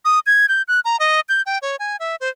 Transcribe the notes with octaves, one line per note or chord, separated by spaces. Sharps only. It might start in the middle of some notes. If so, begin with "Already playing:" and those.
D#6
G#6
G6
F#6
A#5
D#5
G6
G5
C#5
G#5
E5
C5